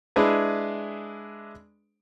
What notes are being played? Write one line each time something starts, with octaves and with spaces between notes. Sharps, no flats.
G#3 D4 E4 G#4 B4